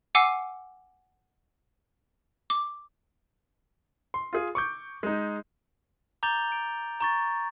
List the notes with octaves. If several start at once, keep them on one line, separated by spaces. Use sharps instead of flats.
F#5 G#5 D6 E6 C7
D6
C6
F4 G#4
C#6 D6 G6
G#3 D#4
A#5 D6 G6 A6 F7 G7
D7
A#5 C#6 A6